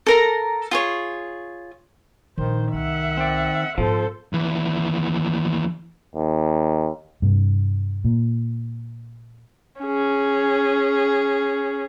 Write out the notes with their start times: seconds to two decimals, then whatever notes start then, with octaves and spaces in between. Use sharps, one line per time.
0.07 A4 A#4 A#5
0.71 F4 G#4 C#5
2.38 A#1 D#3 C5
2.73 C2 E5 F#5
3.17 C4 D5
3.78 G#2 F3 B3 A4 C5
4.33 D#2 E3
6.15 D#2
7.22 G2 C3
8.05 A#2
9.82 C#4 G#4